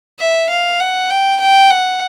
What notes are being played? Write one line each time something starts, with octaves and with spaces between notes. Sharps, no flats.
E5
F5
F#5
G5
G5
F#5